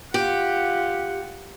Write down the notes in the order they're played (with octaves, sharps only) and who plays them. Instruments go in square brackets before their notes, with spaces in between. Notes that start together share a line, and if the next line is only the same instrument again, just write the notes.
[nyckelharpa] F4 F#5 [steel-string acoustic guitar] G4